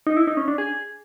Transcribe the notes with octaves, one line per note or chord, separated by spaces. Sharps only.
D#4
E4
D#4
C#4
D4
G#4